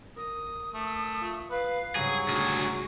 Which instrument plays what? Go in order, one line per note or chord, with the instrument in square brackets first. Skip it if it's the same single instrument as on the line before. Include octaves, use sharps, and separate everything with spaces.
[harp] A#4 [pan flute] D#6
[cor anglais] A3
[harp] F4 C#7
[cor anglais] B4 [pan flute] F5
[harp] G#2 C#3 G3 [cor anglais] F#3 [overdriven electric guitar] G#4
[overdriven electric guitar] D2 G#4 [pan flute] F#4